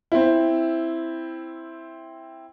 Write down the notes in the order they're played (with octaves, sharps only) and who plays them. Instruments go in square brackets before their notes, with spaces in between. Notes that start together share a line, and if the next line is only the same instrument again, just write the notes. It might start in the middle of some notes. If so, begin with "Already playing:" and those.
[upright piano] C4 E4